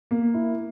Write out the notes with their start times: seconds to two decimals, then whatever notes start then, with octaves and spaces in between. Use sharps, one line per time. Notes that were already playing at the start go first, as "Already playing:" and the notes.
0.11 A#3
0.34 E4